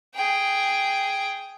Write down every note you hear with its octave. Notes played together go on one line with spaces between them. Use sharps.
G#4 G5